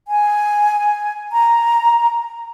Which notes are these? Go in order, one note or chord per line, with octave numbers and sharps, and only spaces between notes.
G#5
A#5